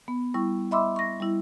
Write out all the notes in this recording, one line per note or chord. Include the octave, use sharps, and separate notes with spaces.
B3
G3 E4 C#6
D#5 E5 B5 C6 D6 E6
C#6 A#6
G3 E4